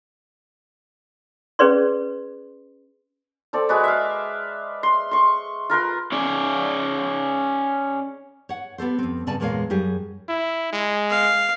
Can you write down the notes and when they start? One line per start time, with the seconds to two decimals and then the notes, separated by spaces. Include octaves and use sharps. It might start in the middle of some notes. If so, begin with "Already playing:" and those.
1.59 C#4 G#4 B4 D5 C6
3.53 C4 A4 D5
3.69 G#3 F#4 B4 D5
3.84 E5 F5
4.83 C6
5.11 C6 C#6
5.70 F4 A#4 B4 C6
6.12 C#4 G#4 D5
8.49 C#5 F#5
8.78 B3 G4 A4 C5
8.99 F2 C4
9.27 G2 C#3 D5 G#5 A5
9.40 E2 A#2 G#3 A#3 C#5 F5
9.70 F#2 G3 G4 G#4
10.29 E4
10.73 G#3
11.10 F5